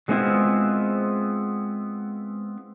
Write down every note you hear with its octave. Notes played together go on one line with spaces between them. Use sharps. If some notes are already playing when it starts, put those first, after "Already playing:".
F#3 G#3 B3 C4 E4 F4